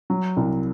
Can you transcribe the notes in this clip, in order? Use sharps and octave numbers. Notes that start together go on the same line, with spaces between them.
F#3
C2